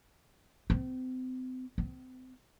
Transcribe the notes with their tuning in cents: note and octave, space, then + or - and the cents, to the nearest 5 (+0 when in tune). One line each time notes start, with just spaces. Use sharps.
C4 -35
C4 -35